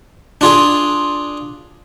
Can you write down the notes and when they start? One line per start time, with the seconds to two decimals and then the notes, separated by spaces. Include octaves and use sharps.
0.41 D4 F4 G#4